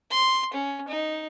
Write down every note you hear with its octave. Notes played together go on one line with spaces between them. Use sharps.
C6
C#4
D#4